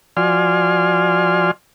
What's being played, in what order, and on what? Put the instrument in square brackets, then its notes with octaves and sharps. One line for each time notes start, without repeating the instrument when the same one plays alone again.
[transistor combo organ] F3 F#4 D5 G#5 C6 F6